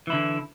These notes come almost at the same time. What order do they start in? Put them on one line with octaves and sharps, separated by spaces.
E3 E4 D3